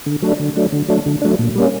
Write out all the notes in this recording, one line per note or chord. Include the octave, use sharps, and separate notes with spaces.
D3
F#3 A3 D4
D3
F#3 A3 D4
D3
F#3 A3 D4
D3
F#3 A3 D4
A#2
G3 A#3 C#4